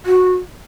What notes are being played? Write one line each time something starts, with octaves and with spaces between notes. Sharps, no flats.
F#4